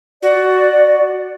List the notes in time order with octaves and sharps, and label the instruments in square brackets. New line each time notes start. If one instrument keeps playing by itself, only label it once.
[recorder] F#4 [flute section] D5